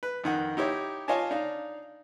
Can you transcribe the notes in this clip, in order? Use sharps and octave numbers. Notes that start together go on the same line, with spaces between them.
B4
F2 D#3 F#5
D#4 E4 G4 C#5
F4 C#5 D#5 F5 G#5 A5
D4 D#4 F5